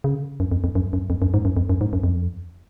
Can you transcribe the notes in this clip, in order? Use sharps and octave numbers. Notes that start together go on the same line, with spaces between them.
C#3
F#2
F2
F2
F#2
F#2
F2
F#2
G#2
F#2
F2
F#2
G#2
F#2
F2